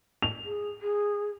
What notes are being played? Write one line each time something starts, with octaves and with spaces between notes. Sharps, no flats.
F7
G#4
G#4